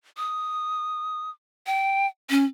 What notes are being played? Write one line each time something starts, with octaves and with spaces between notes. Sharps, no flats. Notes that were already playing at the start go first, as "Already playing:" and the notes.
D#6
G5
C#4